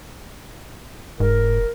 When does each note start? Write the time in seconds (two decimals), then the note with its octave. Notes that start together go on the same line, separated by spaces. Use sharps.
1.20 F1 G#2 A#4